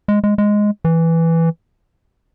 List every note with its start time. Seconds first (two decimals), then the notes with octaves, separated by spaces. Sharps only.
0.08 G#3
0.24 G#3
0.38 G#3
0.85 E3